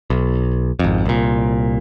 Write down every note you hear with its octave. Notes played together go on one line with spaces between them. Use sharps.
B1
G#1 F2
C2 A#2